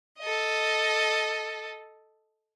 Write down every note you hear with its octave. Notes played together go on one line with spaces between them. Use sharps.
A4 D#5